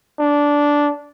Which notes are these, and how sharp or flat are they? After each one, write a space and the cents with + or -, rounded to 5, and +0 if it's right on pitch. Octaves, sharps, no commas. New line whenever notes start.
D4 -10